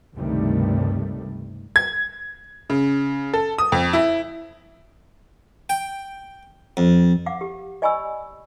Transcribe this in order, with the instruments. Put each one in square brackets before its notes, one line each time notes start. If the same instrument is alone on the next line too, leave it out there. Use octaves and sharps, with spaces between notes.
[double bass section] C#2 G2 C3 D#3 G3 A3
[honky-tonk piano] G#6
C#3
A4
D#6
F2
E4
[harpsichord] G5
F2
[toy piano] F5 F#5 D6
G4
D5 D#5 G#5 B5 C#6 E6